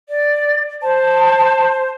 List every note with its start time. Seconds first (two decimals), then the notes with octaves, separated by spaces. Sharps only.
0.09 D5
0.82 C5 A5